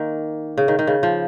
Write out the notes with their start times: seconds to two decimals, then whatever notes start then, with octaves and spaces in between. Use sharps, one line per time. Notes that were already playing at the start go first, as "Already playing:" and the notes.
Already playing: D#3 A#3
0.58 C#3
0.68 D#3
0.79 D#3
0.87 C#3
1.03 F3